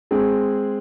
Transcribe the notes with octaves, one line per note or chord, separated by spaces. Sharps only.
G#3 C4 G#4